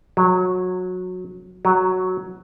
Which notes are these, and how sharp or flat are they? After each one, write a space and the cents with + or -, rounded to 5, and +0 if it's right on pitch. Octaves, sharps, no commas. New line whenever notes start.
F#3 -20
F#3 +0